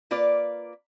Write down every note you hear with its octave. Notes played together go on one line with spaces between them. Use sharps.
A#3 F4 B4 D5